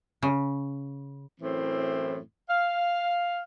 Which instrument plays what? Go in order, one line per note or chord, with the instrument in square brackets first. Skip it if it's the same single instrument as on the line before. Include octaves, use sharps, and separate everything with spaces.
[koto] C#3
[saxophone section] F#2 A2 E3 C4
F5